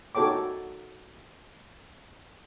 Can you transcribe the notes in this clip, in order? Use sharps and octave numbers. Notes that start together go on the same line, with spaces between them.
D#4 F#4 A4 C#5 G5 D6